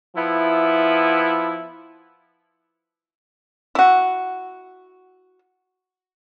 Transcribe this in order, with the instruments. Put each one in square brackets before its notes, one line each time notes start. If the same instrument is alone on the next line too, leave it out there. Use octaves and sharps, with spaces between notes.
[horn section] F3 B3 E4
[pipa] E4 F#4